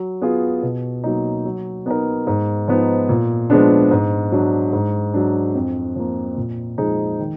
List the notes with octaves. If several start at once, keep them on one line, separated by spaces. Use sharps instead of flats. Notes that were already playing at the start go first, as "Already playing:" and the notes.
Already playing: F#3
B3 F4 G#4
B2
F#3 A#3 D#4
F#3
B3 D#4 A#4
G#2
F3 B3 D#4
A#2
F3 G#3 B3 D4
G#2
F#3 D4
G#2
F#3 D4
F2
F3 A#3
A#2
F3 G#3 D#4 G#4
D#3